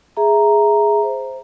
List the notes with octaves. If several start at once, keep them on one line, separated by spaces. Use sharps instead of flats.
G#4 E5 A#5
C5